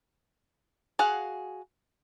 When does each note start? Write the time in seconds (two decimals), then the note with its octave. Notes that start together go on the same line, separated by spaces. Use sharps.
0.99 F#4 G#4 F5 F#5